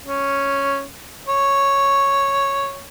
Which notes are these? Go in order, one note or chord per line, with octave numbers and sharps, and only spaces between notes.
C#4
C#5